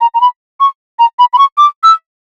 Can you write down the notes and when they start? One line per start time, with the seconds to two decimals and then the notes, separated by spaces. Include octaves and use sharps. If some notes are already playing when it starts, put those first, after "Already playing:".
0.01 A#5
0.14 A#5
0.21 B5
0.60 C#6
0.99 A#5
1.19 B5
1.33 B5
1.38 C#6
1.58 D6
1.83 E6